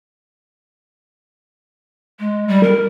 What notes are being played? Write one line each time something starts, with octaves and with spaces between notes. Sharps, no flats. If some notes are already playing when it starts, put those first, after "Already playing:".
G#3
G3
A#4